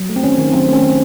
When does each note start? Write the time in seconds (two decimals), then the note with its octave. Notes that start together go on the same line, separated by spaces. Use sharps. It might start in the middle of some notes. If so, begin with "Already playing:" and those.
Already playing: F#3
0.09 A3
0.16 C4
0.24 D#3 C#4
0.38 D#3
0.53 F#3 C4
0.68 A3 C#4
0.83 D#3
0.89 C4